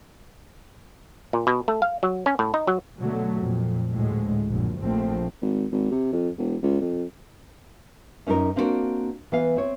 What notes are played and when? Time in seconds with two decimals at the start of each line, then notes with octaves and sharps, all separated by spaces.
1.33 A#2
1.47 B2
1.68 A3
1.82 F5
2.03 F#3
2.26 C#4
2.39 A2
2.54 D#4
2.67 F#3
3.00 B2 D3 F#3 A3
3.37 F2 A#2
3.91 D2 A2 G#3
4.49 A#1 F#2 A#2 D3
4.81 A#1 F3 A3 C4
5.42 G#1
5.72 G#1
5.91 C3
6.13 F2
6.38 E1
6.63 C#2
6.81 F2
8.27 F#2 C#4 D#4 G#4 A#4
8.56 A#3 C4 D4 D#4 F#4 A#4
9.32 E3 B3 F5
9.56 C4 C#5